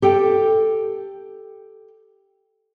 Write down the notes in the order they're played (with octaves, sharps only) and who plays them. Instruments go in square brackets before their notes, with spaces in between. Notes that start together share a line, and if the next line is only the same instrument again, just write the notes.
[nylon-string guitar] G4 A4 G5